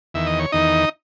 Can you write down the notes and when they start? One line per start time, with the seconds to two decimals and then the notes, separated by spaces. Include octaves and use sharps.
0.14 E2 D#3 E5
0.27 D#5
0.39 C#5
0.52 E2 D#3 D#4 D#5